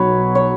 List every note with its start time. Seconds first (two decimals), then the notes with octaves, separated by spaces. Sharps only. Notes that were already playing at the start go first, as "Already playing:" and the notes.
Already playing: B1 B2 F#3 B4 C#5
0.35 C#5